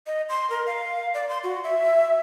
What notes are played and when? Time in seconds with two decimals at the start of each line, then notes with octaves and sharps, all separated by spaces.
0.07 D#5
0.29 C6
0.50 A#4
0.66 F5
1.14 D5
1.29 C6
1.43 F#4
1.63 E5